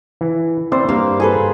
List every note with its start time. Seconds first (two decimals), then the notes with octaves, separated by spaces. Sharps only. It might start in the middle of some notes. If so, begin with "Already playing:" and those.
0.21 E3
0.72 C4 E4 C5 D5
0.89 G2 G3 A#3 F5
1.20 G#4 A4 B4